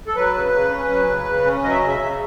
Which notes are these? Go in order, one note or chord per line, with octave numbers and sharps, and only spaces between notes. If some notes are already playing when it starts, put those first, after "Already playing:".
A4
F#3 B4
C#3
C#3
C#4
F#3
C#3
C#3
C#4
F#3 D#5
E5
C#3 D#5
E5
C#3